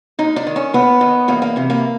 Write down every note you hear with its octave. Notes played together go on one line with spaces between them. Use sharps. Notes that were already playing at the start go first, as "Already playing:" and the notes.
D#2 D#4
D4
D#3
C#4
D#2 B3
D#3
E2 A#3
A#3
C3 E3
A#3